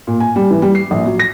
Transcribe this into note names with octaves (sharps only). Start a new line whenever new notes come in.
A#2
G#5
G3
E3
G3
C7
A#1
F#3
A#6